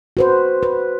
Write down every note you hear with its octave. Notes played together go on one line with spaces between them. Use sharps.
F#4 B4 C5
B4